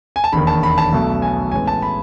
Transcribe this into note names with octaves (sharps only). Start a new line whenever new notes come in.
G#5
A5
E1 D#2 D#3 B5
A5
B5
A5
B1 B2 A3
G#5
A1 A2 G#3 B3 G#5
A5
B5